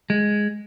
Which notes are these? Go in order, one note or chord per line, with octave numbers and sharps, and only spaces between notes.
G#3